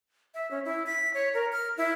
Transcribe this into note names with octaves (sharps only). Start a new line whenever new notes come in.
E5
C#4
E4
B6
C#5
A#4
F6
E4